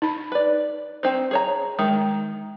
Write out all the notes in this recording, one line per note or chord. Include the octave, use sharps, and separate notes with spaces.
D#4 B5
B4 D5
C4 D#4 C5
G#4 C#5 A#5
D#3 G#3